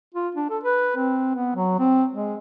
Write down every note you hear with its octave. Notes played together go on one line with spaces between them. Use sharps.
F4
D4
A4
B4
C4
B3
F#3
C4
G#3